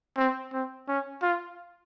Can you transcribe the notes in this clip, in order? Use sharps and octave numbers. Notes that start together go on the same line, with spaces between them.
C4
C4
C#4
F4